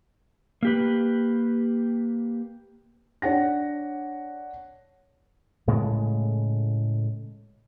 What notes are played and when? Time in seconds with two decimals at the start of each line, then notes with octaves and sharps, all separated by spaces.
0.63 A#3 G4 B4
3.22 D4 C#5 F#5 A#6
5.67 A2 C#3 G#3 A3